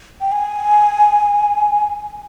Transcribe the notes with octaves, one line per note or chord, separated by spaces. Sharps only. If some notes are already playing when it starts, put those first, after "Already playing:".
G5
G#5